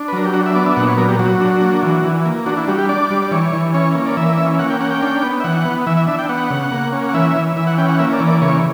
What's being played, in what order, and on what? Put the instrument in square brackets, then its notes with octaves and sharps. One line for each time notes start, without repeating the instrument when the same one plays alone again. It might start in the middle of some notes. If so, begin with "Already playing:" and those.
Already playing: [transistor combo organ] D4
B4
F#3 A#4
G4
D4 F#4
E5
B3 D5
E5
A#2 F#5
C#5
F#3 A#4
G4
F#3 F#4
D4
A#3
E3
E3
A#3
D4 F#4
E4
G3 F#4
G4
D4 D5
G3
D5
E3 C#5
E3
C#4 C#5
A#3
D5
E3 E5
C#4
A#3 F#5
G5
C#4 F#5
G5
D4
B3
E5
E3 F#5
B3
E3 E5
E5
D4 E5
G5
B3 F#5
C#3
A#3
C#4
F#5
E3 E5
E3
E3 E5
F#5
C#4 G5
F#5
A#3 E5
D5
E3
D5
C#3 C#5